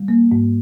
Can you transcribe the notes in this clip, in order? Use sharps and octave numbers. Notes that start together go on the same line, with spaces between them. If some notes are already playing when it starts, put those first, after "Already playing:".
Already playing: G3
A#3
G#2